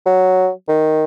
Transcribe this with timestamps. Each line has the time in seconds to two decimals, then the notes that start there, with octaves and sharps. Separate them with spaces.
0.06 F#3
0.68 D#3